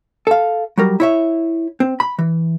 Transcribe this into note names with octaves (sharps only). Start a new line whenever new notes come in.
A4 F5
F#3 G3 A#4
E4 C#5 E5
C4
B5
E3